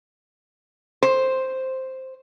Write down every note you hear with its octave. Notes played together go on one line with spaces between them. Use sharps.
C5